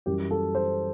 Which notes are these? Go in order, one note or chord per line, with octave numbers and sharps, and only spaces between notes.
F#2 E3 G3 G4
A4
C5